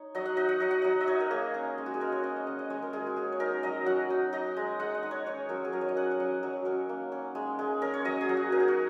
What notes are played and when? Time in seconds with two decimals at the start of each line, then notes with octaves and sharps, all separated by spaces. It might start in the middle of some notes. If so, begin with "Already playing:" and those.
Already playing: D#4 C#5
0.15 F#3 D#5
0.26 F#5
0.37 D#4 D#5
0.49 F#5
0.60 F#3 D#5
0.71 F#5
0.82 F#3 D#5
1.01 D#5
1.07 D#4 C#5
1.20 A#4
1.31 A#3 G#4
1.54 C#4
1.78 G#3
1.86 F#4
1.94 G#4
2.01 G#3 A#4
2.12 C#5
2.23 C#4 D#5
2.36 D#5
2.47 C#4 F#5
2.59 D#5
2.70 G#3 C#5
2.82 A#4
2.93 G#3 G#4
3.07 F#4
3.16 C#4 G#4
3.32 C#5
3.40 D#4 A#4
3.63 F#3 D#5
3.86 F#3 F#5
4.10 D#4
4.33 D#4 D#5
4.57 G#3
4.80 G#3 F#5
4.95 D#5
5.03 D#4
5.11 C#5
5.26 C#4 C#5
5.49 F#3 A#4
5.65 G#4
5.72 F#3 A#4
5.81 C#5
5.89 D#5
5.96 C#4 F#5
6.11 C#5
6.20 F#3 D#5
6.43 F#3
6.65 C#4 A#4
6.89 A#3
7.12 C#4
7.35 G#3
7.59 G#3
7.82 C#4 A#4
7.94 C#5
8.05 F#3 D#5
8.21 G#4
8.29 F#3
8.37 F#4
8.52 D#4 A#4
8.60 G#4
8.68 F#4